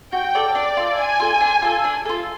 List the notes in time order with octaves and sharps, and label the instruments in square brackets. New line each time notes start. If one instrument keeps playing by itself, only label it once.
[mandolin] F#4 [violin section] G5
[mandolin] A4 D5
[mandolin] D4 [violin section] D5
[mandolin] F4 A4
[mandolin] D4 [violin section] G#5
[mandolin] F4 A4
D4
F4 A4
D4
F4 A4